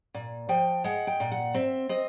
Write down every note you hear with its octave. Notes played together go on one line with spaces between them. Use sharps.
A#2
F3 G5
G#3 F#5
G5
A#2
F#5
C4 E5
C4 D#5